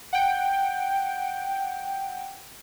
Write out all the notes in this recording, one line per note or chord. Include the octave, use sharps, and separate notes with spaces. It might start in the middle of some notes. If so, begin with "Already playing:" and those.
F#5 G5